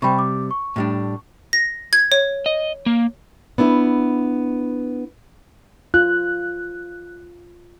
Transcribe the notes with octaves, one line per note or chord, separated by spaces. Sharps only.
C3 G3 G5 B5 C#6
D6
C#6
A2 G3 D4
A#6
G#6
C#5
D#5
A#3
B3 D4 E4 B4
F4 F#6